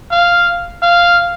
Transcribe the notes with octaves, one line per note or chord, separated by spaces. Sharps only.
F5
F5